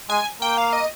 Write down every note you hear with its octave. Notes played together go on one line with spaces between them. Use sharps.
G#3 G#5
A#3 G5
F5
D#5